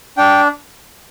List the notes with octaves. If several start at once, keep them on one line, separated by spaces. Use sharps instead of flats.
D4 G5